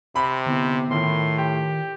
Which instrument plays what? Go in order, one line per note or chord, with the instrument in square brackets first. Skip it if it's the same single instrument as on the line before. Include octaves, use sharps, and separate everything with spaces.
[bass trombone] C3 [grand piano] B5
[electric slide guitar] D3 B3 E4
[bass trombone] A2 [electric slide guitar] D#3 F4 A#4 [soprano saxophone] C6
[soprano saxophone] G4